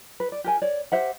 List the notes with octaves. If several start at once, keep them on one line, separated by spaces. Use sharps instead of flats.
B4
D5
G4 A#4 G#5
C#5 D5
G4 C5 E5 F#5